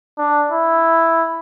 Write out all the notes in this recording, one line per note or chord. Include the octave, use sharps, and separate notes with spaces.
D4
E4